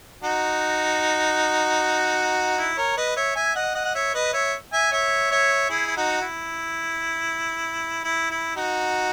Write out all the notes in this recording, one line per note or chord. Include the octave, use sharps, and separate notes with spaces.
D#4 F#4
E4
A#4 C#5
B4 D#5
C#5 E5
E5 G#5
D#5 F#5
D#5 F#5
F#5
C#5 E5
B4 D#5
C#5 E5
E5 G#5
C#5 E5
C#5 E5
E4 G#4
E4
D#4 F#4
E4
E4
E4
D#4 F#4